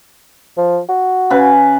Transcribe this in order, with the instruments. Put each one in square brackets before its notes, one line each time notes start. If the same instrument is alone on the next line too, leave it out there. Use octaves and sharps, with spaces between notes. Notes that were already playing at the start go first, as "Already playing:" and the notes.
[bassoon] F3
F#4
[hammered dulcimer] C#3 B4 G#5